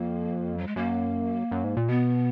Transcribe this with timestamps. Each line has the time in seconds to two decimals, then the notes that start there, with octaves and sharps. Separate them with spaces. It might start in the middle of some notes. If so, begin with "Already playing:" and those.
Already playing: F2 A#3
0.58 F#3
0.67 G#3
0.76 F#2 A#3
1.51 F#2
1.64 G#2
1.77 A#2
1.89 B2 B3